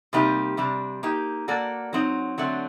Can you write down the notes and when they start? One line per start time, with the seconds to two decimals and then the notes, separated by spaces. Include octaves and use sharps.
0.13 C3 G3 A#3 D#4 G4
0.57 C3 G3 D4
1.03 A#3 D#4 G4
1.48 A#3 F#4 A4 D5
1.93 F#3 C4 D#4
2.38 D3 F#3 A3 C4